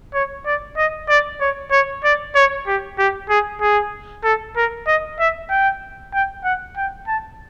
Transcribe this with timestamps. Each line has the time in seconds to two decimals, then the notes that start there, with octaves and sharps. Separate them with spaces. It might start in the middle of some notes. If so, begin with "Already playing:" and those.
0.14 C#5
0.46 D5
0.77 D#5
1.09 D5
1.41 C#5
1.71 C#5
2.04 D5
2.35 C#5
2.67 G4
2.98 G4
3.29 G#4
3.61 G#4
4.24 A4
4.56 A#4
4.87 D#5
5.19 E5
5.50 G5
6.14 G5
6.44 F#5
6.77 G5
7.07 A5